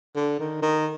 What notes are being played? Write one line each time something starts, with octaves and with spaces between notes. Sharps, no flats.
D3
D#3
D#3